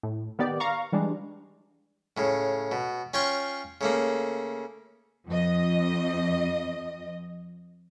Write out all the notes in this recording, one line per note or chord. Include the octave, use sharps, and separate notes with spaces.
A2
D#3 B3 G4 D5
F5 A#5 C#6
E3 G3 G#3 D4
A2 C#3
B2
C#4 F4 C#5 G5 C6 C#6
C#3 A3 A#3
F2 D#5